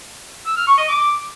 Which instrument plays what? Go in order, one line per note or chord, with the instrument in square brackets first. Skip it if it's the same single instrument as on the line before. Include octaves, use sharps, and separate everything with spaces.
[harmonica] E6
F6
C#6
D#5
D6